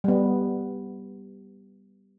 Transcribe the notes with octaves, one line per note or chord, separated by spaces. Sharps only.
G3 B3